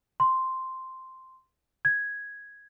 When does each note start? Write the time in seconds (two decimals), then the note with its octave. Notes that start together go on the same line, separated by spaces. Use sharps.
0.20 C6
1.85 G#6